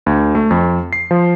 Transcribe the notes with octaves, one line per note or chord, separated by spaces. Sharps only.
D2
A3
F2
C7
F3